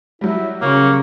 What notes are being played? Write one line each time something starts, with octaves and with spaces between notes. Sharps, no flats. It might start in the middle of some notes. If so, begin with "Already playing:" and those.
F#3 G3 E4
C#3 A#3 C#5